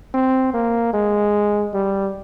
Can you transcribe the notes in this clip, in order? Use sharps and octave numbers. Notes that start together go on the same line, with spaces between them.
C4
A#3
G#3
G3